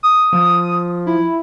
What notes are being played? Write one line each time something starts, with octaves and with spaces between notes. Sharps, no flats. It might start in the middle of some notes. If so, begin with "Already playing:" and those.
D#6
F3
E4